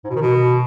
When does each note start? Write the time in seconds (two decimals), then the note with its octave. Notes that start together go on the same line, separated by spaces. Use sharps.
0.04 G#2
0.10 B2
0.16 D#3
0.21 B2